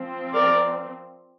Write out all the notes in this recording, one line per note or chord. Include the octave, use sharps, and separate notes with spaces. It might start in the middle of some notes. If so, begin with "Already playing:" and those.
Already playing: F3 C4
A#4 D5